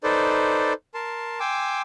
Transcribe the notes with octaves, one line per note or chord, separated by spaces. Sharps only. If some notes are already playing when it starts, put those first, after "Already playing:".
D#4 A4 B4 C5 D5
A#4 A5 C6
G5 G#5 C6 D6 E6